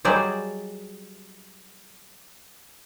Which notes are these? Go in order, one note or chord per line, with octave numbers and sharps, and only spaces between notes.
F#3 G3 G#4 C5 D5 D#5